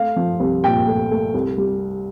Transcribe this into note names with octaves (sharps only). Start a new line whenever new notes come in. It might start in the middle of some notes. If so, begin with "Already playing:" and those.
Already playing: A3 F5
F3
C2
A#2 G5
A3
A3
C2
G3